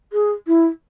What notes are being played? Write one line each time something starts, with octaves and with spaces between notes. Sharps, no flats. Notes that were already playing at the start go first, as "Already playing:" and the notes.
G#4
E4